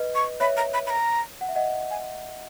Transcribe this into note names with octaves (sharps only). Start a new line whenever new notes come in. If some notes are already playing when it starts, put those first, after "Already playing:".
Already playing: B4 D#5
C#6
C#5 E5 B5
A#5
B5
B5
A#5
F#5
E5
D#5 F#5
G#5